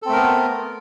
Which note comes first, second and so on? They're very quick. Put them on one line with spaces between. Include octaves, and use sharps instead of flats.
A4 C4 A3 A#4 B3